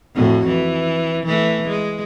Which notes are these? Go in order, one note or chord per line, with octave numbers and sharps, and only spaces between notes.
F2 A2 F#4
E3
E3 A3
G#3